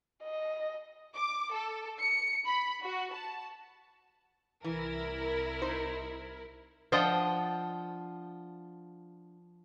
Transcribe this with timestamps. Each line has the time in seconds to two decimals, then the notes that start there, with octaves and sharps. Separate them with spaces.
0.23 D#5
1.15 D6
1.52 A4
1.99 C#7
2.46 B5
2.82 F#4
3.12 A5
4.64 C2 E3 E4 A#4
5.62 D#4 C5
6.92 F3 D4 F4 D#5 F#5 G5